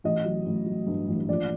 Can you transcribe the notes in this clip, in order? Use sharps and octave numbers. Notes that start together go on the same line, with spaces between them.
A1 D#5
F#3
A1
F#3
G2
A1
A#1 D5